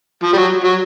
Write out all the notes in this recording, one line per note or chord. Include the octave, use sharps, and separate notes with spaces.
F3
G3
F#3
F#3